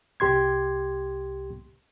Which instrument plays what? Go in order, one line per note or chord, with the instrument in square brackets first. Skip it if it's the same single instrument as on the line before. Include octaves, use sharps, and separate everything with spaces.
[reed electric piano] C2 G4 C6 G#6